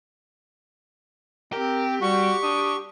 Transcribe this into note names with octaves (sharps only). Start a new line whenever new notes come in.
C4 G4 A#4
G3 F#4 C#6
D4 D#6